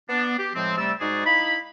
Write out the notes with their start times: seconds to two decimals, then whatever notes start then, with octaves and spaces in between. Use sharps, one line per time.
0.09 B3 D4
0.38 G4
0.55 A2 F3 G#3 C4
0.77 C3 G3 A3 D5 E6
1.00 G#2 G#3 D#4 F#4 G#4 D5
1.26 D#4 E4 F5 B5